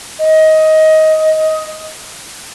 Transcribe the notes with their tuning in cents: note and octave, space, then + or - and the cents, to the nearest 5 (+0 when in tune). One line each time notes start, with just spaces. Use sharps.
D#5 +15